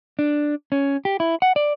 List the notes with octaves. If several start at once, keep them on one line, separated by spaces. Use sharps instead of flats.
D4
C#4
G4
E4
F#5
D5